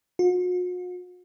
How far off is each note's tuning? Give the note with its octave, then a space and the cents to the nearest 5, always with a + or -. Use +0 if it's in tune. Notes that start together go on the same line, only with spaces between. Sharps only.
F#4 -45